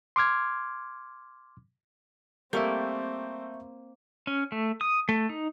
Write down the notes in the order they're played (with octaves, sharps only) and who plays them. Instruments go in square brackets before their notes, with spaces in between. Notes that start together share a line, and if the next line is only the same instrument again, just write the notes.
[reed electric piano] C6 D6 F6 G#6
[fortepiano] G3 A3 [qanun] A#3 [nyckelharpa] C4 [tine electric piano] E5 C#6 G6
[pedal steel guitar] C#4
A3
D#6
A3
D#4